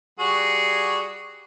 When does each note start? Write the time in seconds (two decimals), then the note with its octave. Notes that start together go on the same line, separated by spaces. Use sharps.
0.19 G3 F#4 G#4